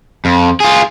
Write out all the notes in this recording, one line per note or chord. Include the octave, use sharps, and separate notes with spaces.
F2
F4 G#4